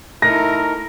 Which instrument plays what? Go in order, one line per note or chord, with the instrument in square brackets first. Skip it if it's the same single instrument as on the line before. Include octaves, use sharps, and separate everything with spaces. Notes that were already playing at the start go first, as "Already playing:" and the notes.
[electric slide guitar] A3 D#4 [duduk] E4 [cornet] A#4 [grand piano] A#6